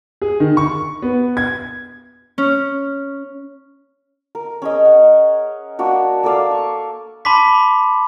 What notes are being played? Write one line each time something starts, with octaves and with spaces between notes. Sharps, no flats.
G#4
D#3
C#6
B3
G#6
C#4
A#4
C#4 G#4 D#5
F#5
A#3 D4 F#4 A#4
A#3 A4 D5 F5
C#6
A5 B5 C6 D6 B6